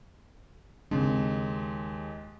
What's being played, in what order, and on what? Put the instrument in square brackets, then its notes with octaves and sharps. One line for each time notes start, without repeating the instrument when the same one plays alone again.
[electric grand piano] D#2 G#3 [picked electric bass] C#3 C4 D4